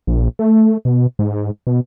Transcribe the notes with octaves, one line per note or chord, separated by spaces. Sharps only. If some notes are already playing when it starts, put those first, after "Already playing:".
A#1
A3
B2
G#2
B2